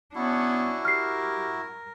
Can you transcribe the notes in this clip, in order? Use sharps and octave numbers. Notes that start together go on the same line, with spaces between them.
B3 C#4 D4 E4 F#4
G4 A#4 F6 C7